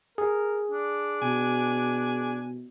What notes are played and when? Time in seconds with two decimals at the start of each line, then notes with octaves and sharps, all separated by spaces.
0.18 G#4 A#4
0.71 D4
1.22 B2 G#5